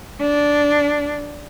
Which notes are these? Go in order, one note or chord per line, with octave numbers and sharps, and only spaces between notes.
D4